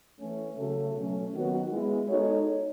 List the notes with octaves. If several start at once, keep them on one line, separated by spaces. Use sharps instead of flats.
E3 A3 C#4
C#3 F#3 A3
B2 F#3 A3 C#4
D#3 F#3 B3 F#4
G#3 B3 E4
G#3 D#4 F#4 A4 C#5